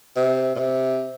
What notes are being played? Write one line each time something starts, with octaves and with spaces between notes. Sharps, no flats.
C3
A#2
C3